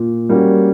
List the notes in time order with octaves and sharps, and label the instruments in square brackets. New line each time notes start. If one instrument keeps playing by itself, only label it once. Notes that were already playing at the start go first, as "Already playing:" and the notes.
Already playing: [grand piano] A#2
G3 A#3 C#4 F#4